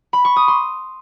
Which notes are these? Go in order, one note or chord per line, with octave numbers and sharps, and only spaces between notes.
B5
C#6
D#6
C6